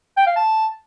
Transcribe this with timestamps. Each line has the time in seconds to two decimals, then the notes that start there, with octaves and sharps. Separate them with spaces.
0.17 G5
0.27 F5
0.36 A5